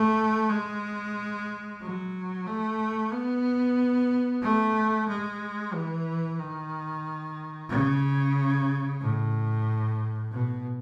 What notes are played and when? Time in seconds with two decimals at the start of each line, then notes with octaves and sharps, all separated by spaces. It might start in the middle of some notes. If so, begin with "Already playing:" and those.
Already playing: A3
0.50 G#3
1.82 F#3
2.46 A3
3.13 B3
4.42 A3
5.09 G#3
5.73 E3
6.40 D#3
7.70 C#3
9.01 A2
10.31 B2